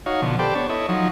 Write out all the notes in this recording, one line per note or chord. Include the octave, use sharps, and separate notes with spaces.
D#4 F#4 C#5 F5
B2 D3 F3
G4 A4 B4 C5 D5 G5
B3 D4 C#5
E4 A4 C#5 D#5
F3 F#3 D#4